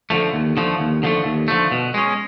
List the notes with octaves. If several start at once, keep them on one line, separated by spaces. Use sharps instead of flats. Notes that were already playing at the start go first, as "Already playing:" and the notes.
D3 F3 A3
D#2
D3 F3 A3
D#2
D3 F3 A3
D#2
D3 F3 A3
B2
G#3 C#4